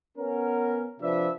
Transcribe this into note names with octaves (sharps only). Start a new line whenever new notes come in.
B3 C#4 A#4
C3 F3 D4 B4 D5 E5